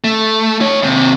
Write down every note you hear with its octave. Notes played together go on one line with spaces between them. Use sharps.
A3
D#4 C#5
D#2 C3